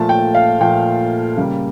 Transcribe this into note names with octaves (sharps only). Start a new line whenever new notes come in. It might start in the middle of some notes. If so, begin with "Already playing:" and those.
Already playing: A#2 F3 A3 A5
G5
F5
A#2 F3 A3 G5
C#3 G3 A#3